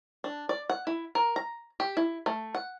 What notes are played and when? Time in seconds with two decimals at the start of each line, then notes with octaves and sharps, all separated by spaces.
0.24 D4
0.49 D5
0.70 F#5
0.87 E4
1.15 A#4
1.36 A#5
1.80 G4
1.97 E4
2.26 A3
2.55 F#5